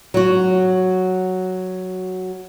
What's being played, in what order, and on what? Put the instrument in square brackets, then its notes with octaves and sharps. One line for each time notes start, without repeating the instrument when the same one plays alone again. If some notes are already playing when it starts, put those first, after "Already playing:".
[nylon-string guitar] F#3 F#4